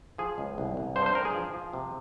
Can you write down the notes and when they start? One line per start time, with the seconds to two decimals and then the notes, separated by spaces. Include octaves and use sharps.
0.18 F3 G#4
0.38 C#2
0.58 C2
0.77 C2
0.96 G2 C5
1.06 C5
1.15 G2 A#4
1.25 G#4
1.35 F3
1.54 F3
1.73 C3